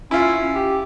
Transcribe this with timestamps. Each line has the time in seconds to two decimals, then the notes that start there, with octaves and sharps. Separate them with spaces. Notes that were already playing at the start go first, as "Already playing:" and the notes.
0.11 C#4 E4 F4
0.55 G4